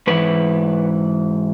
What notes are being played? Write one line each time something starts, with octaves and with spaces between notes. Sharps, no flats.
G#2 E3 B4